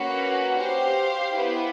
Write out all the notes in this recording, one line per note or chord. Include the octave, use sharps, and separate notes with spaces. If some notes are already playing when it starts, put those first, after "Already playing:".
Already playing: A#3 C#4 F#4 B4
G4 C5 F5
B3 E4 G4 B4